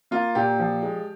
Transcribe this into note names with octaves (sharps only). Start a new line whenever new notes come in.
A#3 F4
A#2 G4
F3
G#3